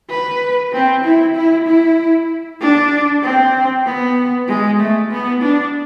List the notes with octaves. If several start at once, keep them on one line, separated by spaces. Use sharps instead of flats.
B4
C4
E4
E4
E4
D4
C4
B3
G#3
A3
B3
D4